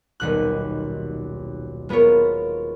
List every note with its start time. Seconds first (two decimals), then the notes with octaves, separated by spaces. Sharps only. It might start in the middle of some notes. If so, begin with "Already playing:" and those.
0.20 D#1 B1 F#6
1.89 G#3 B3 F4 A#4 C#5